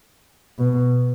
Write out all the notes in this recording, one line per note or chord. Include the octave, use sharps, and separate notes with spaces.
B2